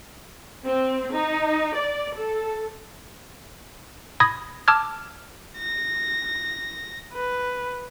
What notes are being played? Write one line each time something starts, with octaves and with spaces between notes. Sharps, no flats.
C4
D#4
D5
A4
B5 D#6 G#6 A#6
A5 D6 E6 F6 G#6
A#6
B4